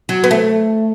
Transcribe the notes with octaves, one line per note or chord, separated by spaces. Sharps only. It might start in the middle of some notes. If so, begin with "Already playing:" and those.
F#3
B3
A3